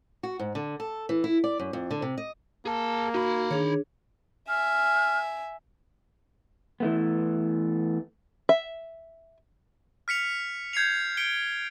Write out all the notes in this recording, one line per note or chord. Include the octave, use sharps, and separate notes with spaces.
F#4
G#2
D3
A4
E3
E4
D5
F#2
F2
D3
C3
D#5
A#3 G#4 A5
D#4 F#4 B5
D#3 D4 G#4 C#5
E5 G#5 F6
E3 A3 B3
E5
F6 B6 C#7 F7
G6 G#6 C7 C#7 F7
G6 B6 C#7 D7 G7